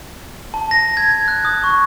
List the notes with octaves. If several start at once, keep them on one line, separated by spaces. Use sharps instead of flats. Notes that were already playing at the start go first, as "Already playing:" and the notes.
A5
A#6
G#6
F#6
D#6
C#6